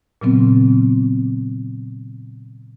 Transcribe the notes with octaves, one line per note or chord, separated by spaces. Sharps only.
A#2 C#3 F#3 B3 C4